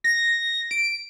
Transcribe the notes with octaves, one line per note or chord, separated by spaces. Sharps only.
A#6
D7